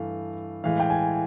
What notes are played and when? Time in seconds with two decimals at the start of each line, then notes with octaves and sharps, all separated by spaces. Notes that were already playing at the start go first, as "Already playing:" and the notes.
Already playing: G2 E3 A3 F5
0.64 A2 E3 G#3 F5
0.80 G5
0.90 G#5